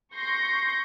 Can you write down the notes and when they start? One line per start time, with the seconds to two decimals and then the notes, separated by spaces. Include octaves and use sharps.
0.16 C6 C#6 G6 A#6